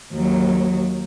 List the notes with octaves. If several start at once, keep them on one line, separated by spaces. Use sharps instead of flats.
D#2 F#3